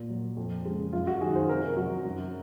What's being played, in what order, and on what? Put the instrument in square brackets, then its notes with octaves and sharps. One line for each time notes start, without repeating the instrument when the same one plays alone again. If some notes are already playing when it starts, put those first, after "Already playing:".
Already playing: [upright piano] A#2
F#3
F2
C#3 G#3
F#2 F4
F#4
D#3 F#3 G#4
C5
C3 A#4
F#3 F#4
F#2